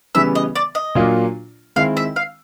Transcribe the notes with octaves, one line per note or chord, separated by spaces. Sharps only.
C#3 E3 G3 B3 E5
D#5
D5
D#5
A#2 F#3 A#3 D4 F4
D#3 G#3 C4 E4 F5
E5
F5